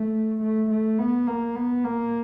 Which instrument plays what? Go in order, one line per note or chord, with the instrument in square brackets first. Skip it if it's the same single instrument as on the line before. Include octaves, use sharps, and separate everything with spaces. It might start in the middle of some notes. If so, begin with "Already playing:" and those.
Already playing: [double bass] A3
A3
A3
B3
A#3
B3
A#3